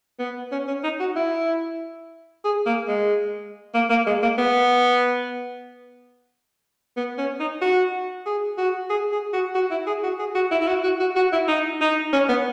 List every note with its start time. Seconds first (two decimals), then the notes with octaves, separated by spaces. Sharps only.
0.19 B3
0.52 C#4
0.68 C#4
0.84 D#4
1.00 F#4
1.16 E4
2.45 G#4
2.66 A#3
2.88 G#3
3.75 A#3
3.90 A#3
4.07 G#3
4.23 A#3
4.38 B3
6.97 B3
7.18 C#4
7.40 D#4
7.62 F#4
8.26 G#4
8.58 F#4
8.90 G#4
9.12 G#4
9.33 F#4
9.55 F#4
9.71 E4
9.87 G#4
10.04 F#4
10.19 G#4
10.35 F#4
10.51 E4
10.62 E4
10.68 F#4
10.84 F#4
11.00 F#4
11.16 F#4
11.33 E4
11.48 D#4
11.81 D#4
12.13 C#4
12.29 B3